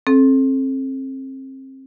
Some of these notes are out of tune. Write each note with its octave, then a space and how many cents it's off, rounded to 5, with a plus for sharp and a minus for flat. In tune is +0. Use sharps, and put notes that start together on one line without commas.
C4 +30 A4 -25